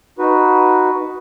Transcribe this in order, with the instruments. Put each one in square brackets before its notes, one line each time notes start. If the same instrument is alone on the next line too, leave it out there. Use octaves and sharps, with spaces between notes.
[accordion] D#4 F#4 B4